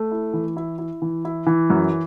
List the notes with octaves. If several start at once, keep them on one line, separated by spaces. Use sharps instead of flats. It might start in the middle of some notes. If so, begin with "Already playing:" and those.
Already playing: A3
E4
E3
E4
E4
E3
E4
E3
F#2